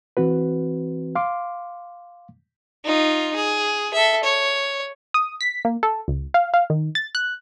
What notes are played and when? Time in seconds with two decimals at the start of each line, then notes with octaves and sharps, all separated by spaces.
0.17 E3 C4 F#4 B4
1.15 F5 C6 D6
2.85 D#4 F4
3.36 G#4
3.94 A4 E5
4.24 C#5
5.14 D#6
5.41 B6
5.65 A#3
5.83 A4
6.08 C#2
6.34 F5
6.54 F5
6.70 D#3
6.95 A6
7.15 F#6